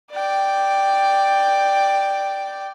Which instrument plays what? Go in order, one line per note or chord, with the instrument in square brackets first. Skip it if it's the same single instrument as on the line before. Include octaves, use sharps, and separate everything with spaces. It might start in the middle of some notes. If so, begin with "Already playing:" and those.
[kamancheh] D5 G5